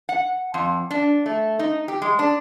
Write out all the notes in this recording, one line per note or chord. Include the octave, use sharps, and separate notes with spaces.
F#5
F2
D4
A3
D#4
G4
G#3
D4